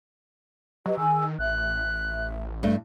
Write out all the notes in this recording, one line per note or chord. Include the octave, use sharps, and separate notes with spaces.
F#3 G4 B4 D#5
D#3 G#4 G#5 E6
A1 E5 F#6
G2 A3